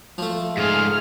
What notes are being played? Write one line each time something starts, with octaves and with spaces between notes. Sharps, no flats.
F3 A3
G#2 F4 G#4 F6